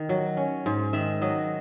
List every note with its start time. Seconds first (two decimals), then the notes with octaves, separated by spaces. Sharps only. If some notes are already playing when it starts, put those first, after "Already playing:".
Already playing: D#3
0.09 F#3
0.37 C#4
0.66 G#2
0.93 D#3 E5
1.21 F#3 D#5